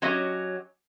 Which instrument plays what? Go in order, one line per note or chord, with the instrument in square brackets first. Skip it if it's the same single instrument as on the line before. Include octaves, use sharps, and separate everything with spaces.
[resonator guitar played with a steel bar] F#3 C#4 G4 D#5